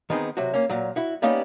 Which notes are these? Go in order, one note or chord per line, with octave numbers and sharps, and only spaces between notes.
D#3 B3 C4 D#4 G#4
C3 F#3 F#4
A#3 C#4
A#2 F#3
E4 F#4
G3 A#3 B3 C#4 D#4